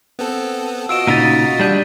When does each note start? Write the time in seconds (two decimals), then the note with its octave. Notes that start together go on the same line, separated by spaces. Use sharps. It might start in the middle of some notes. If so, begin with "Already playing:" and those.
0.19 B3 C4 A4
0.89 F4 F#4 D#5 E6 D7 E7
1.07 A#2 C#3 D#4 A6 B6 D#7
1.59 G3 D4 G6 D#7